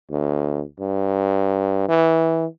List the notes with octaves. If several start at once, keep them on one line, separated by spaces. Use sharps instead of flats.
D2
G2
E3